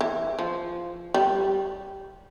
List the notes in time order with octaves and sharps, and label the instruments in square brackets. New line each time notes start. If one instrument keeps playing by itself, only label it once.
[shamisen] E3
F3
G3